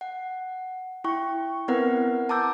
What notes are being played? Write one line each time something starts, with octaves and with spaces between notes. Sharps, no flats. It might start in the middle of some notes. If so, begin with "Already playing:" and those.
F#5
E4 G5 C#6
B3 C4 E4 A#4 B4 F#5
A5 A#5 D6 E6 G6